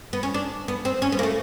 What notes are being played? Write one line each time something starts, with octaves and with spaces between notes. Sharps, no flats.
B3
C#4
D4
B3
C4
C#4
B3
A#3
A3